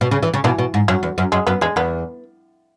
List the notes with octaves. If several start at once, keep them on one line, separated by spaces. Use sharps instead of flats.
B2
C#3
E3
C#3
B2 E3
B2
G#2
F#2 F#3
E2
F#2
F#2 G#3
F#2 B3
E2 G#3
E2 B3